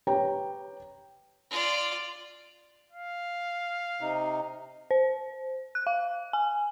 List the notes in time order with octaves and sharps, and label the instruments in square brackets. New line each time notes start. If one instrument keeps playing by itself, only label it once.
[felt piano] G4 B4 C#5 G5 A#5
[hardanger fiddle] F4 D5
[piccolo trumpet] F5
[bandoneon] C3 D#4
[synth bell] C5
F#6
F5
G#5